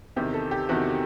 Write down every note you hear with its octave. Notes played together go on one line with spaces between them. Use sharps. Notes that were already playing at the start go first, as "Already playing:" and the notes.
E2 C3 D#3 G4
A4
G4
E2 C3 D#3 F#4